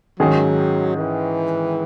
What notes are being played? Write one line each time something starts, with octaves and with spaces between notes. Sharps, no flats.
G#2 D#3 F#3 G#3 C#4 G#4
E3